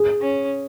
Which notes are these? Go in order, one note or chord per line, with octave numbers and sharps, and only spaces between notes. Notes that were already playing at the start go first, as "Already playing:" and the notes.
Already playing: G#4
C#4